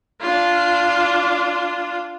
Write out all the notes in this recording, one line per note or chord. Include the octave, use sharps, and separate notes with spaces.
D4 F4